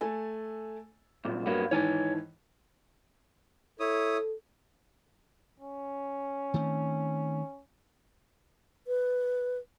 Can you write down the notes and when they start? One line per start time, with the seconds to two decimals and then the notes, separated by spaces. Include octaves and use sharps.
0.01 A3 A4 G#5
1.25 C2 F#2 A#2
1.46 G2 F#3 A#3 B3
1.71 G#2 D#3 E3 C#5 G#5 A5
3.80 E4 A4 C#5 D#6
5.60 C#4
6.54 D#3 A3 C4
8.87 B4